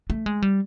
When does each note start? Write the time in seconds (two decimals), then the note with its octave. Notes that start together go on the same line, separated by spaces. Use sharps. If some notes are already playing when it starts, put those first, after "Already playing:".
0.10 A3
0.26 G#3
0.42 G3